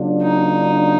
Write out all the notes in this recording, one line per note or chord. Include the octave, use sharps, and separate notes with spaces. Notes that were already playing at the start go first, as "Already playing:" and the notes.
Already playing: C#3 F#3 A#3 D4 F4
D#4